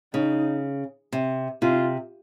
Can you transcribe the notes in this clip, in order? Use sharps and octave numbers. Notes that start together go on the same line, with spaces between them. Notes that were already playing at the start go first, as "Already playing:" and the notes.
C#3 D#4
C3
C3 F4